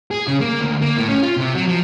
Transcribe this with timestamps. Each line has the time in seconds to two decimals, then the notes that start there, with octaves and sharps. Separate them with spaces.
0.11 G#4
0.27 C#3
0.41 A#3
0.61 D2
0.81 A#3
0.97 A2
1.09 C#4
1.23 F4
1.37 C3
1.55 F#3
1.67 F3